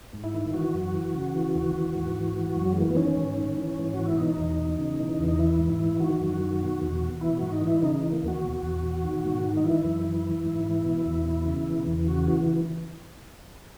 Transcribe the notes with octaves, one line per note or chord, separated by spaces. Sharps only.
G#2
E4
D#3
E3 F#4
F#2
E3
C#3
E3
D#2
E3
G#2
E3
E3
F#2
F#3
G#3
E3 A#3
B3
D#3 C#4
G#2
D#3
E3
G#2
E3 F#4
E4
B2 D#4
E2
B2
C#3
E3
E2
D#4
E3 E4
G#2
E4
E3
D#3 F#4
F#2
D#3
B2
E2
B2
E3 E4
G#2 F#4
D#4
E3
E4
C#3 D#4
E3
A#3
D#2 F#4
B2
E2
B2
D#3
G#2
D#3
D#4
E3 E4
F#2
E3
E3
G#2
E3
B2
E2
B2
C#3
E3
E2
C#3 F#4
E3 F#4